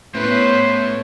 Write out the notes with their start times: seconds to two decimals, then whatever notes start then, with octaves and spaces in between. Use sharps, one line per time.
0.15 A2 A3 B3 C#4 B4 C5